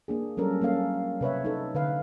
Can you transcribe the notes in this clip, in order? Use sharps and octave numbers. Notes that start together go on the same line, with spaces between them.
A#3 D4 G#4
F#3 G3 C#4 A4 A#4
A#3 C#4 A4 F5
C3 B4 C#5 E5
D#4 A4
D3 B4 F5